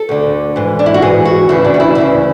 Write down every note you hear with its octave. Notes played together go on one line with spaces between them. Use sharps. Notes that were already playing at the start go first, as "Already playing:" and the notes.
Already playing: A4
D2 D3
G#2 E3
D4
E4
F#4
G#2 E3 G#4
F#4
D2 C#3 E3 E4
D4
F#4
E4
D2 C#3 E3 E4